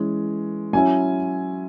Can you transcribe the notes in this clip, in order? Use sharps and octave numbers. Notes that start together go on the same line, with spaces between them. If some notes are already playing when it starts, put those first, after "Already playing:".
Already playing: E3 G#3 C#4
F#3 C#4 E4 G#5